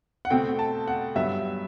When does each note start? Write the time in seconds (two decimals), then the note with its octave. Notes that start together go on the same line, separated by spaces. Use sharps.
0.25 F#5
0.30 B2 A3 C4 G5
0.59 A5
0.88 F#5
1.15 G2 F#3 B3 E5